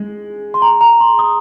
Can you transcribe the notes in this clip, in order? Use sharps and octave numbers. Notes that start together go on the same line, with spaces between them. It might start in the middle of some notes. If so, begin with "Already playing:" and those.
Already playing: G#3
C6
A#5
A#5
C6
D#6